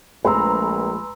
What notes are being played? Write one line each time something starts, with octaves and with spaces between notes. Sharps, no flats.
A#1 G#3 A3 B4 G#5 A#5 C6 E6